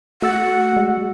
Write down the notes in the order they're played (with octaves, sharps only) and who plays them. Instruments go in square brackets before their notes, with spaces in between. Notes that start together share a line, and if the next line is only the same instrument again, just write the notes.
[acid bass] A3 [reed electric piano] F#4 E6 A6 [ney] F#5
[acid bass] G#3